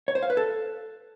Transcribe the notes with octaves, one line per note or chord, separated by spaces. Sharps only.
C#5
C5
F5
B4
A4